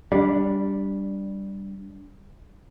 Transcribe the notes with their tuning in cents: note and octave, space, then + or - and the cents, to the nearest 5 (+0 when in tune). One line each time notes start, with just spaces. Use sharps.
G3 +0 D4 -15